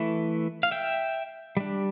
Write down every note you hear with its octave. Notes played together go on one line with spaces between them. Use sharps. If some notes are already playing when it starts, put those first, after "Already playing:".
Already playing: E3 A3 E4
F5
E5 G5
G3 D4